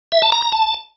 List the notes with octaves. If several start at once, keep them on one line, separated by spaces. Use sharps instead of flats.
E5
A5
A#5
A#5
A5